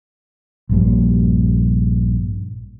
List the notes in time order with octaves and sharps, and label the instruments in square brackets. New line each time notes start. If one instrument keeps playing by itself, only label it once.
[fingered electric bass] A#1 G2 A#3